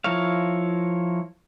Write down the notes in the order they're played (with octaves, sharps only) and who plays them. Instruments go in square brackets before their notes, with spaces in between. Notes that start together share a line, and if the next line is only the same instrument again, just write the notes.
[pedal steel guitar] F3 E4 A#4 C#5 F5